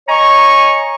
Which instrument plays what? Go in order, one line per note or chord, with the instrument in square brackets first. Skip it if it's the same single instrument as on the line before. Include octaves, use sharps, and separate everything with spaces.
[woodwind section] C#5 D#5 G#5 A#5 C#6